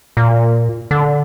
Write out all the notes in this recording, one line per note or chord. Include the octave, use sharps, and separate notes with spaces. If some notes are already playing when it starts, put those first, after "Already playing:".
A#2
D3